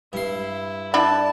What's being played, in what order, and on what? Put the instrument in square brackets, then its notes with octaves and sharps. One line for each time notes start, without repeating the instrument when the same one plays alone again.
[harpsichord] G2 C6 [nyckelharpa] E4
[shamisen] D4 E4 B5 [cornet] D5 [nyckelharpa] A5